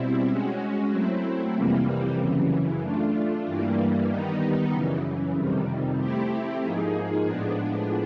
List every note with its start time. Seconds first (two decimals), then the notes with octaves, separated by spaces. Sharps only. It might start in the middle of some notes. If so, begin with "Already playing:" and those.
Already playing: B2 G3 C4 E4
0.28 G#3 C#4 F#4
0.91 F#3 A3 C4 E4
1.55 F2 C3 E3 G3 A#3
2.18 F#2 C#3 E3
2.82 A3 D4 F4
3.45 G2 E3 G3 A#3
4.09 D#3 G3 B3 D#4
4.72 F#2 C#3 E3
5.35 F2 C3 D#3 G3
5.99 A3 C4 E4 G4
6.63 G#2 F3 A#3 D#4 G#4
7.26 A2 F3 G#3 B3 D4